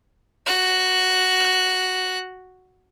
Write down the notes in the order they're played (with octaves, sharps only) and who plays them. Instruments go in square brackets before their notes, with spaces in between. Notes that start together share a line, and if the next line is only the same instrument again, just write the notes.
[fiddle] F#4 F#6